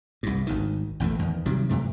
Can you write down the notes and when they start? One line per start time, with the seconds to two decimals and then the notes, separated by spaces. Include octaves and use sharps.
0.23 C2 G2
0.47 G#1 D2 D#3
1.00 A1 E2 A#2 A3
1.19 E2 D#3
1.46 C3 D#3 F#3 G3
1.69 G2 C3 A3